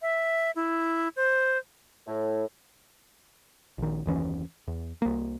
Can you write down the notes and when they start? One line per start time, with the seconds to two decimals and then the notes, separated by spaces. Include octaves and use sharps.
0.02 E5
0.56 E4
1.16 C5
2.07 A2
3.78 A#1 D#3
4.06 F#1 D#2 E3 C#4
4.68 E2
5.02 C2 A#3